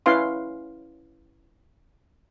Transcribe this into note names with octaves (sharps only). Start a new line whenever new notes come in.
C#4 E4 B4 F5 C6